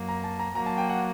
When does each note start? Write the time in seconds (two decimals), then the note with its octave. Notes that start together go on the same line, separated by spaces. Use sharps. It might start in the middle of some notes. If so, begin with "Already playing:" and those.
Already playing: F#2 F#3 A#3
0.09 A#5
0.24 A5
0.39 A#5
0.55 F#3 A#3 F#4 A#5
0.66 A5
0.78 G5
0.90 F#5